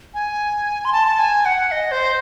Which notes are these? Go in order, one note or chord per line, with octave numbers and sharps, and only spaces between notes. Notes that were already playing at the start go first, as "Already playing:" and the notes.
G#5
C6
A5
A5
G#5
F#5
D#5
C5